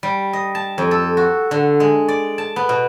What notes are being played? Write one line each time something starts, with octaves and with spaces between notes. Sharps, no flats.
G3
D#5
A5
F2
A4
F#4
D3
G#3
D5
A5
B3
B2